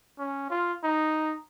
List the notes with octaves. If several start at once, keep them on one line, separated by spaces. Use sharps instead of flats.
C#4
F4
D#4